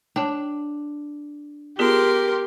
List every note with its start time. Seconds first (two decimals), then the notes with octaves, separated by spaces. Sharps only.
0.16 D4 C#5 G5
1.79 B3 F4 G4 G#4 A#4 C6